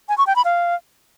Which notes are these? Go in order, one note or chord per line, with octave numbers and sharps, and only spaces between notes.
G#5
C#6
G5
B5
F5